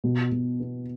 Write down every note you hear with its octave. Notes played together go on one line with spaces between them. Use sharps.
B2
B2
B3